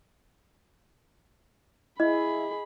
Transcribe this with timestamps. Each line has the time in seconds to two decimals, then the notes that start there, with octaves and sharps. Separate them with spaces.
2.00 E4 G#4 D#5 B5